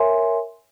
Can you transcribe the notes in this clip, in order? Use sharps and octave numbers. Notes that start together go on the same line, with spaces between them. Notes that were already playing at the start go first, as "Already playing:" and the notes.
Already playing: A#4 C#5 E5 G#5 C6